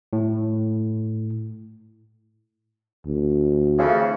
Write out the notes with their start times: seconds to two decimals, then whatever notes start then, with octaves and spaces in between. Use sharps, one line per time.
0.13 A2
3.06 D2
3.78 F2 C#3 E3